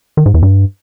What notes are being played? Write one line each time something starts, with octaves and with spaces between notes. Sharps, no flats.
D#3
G#2
E2
G2